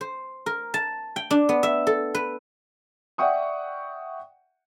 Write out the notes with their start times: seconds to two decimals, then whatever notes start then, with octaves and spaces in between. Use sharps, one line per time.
0.01 C5
0.46 A#4
0.74 A5
1.16 G5
1.31 D4
1.49 B3
1.63 E5
1.87 A4
2.14 B4
3.18 D5 E5 F#5 G5 C#6 D#6